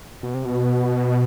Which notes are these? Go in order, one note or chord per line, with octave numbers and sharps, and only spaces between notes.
B2
C3
B2